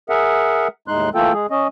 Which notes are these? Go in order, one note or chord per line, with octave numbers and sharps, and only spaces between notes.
G#4 A#4 E5 F#5
D#2 A2 G#3 D#4 C6 F#6
E3 A3 A#3 F4 A4 G5
G#3 G#4
C#4 D#5